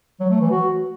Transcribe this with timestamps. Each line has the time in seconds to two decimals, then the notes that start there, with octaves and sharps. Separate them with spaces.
0.20 F#3
0.30 A3
0.41 E3
0.51 F#4